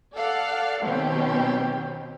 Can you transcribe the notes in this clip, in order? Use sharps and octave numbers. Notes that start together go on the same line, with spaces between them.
A4 D5 F5 F#5
B2 D#3 F#3 C4 C#4 G4